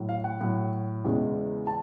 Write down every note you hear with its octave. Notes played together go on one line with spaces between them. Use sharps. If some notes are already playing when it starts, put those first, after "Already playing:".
Already playing: A2 F#3
F5
F#5
A2 F#3
E2 C#3 E3 G#3
A5